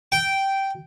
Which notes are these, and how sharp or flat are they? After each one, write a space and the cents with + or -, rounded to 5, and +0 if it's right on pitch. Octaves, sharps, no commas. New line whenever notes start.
G5 -10